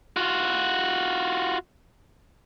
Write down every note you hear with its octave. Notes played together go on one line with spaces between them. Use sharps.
F4 F#4